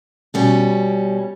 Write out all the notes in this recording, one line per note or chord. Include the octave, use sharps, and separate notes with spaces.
B2 G3 C#4